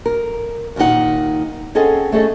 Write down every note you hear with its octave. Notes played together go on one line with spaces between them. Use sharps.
A#4
D#2 A#2 D#3 D#4 F#5
C4 C#4 G#4 A4 D#5 F#5
A3 C#4 G#4 A4 D#5